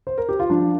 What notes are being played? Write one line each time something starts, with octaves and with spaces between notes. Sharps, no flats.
C5
A#4
G4
F4
F3 D4